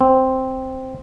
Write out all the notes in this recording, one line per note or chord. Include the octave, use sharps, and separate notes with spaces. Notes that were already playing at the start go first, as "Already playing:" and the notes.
C4